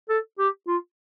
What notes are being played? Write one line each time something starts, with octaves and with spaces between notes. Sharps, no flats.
A4
G4
F4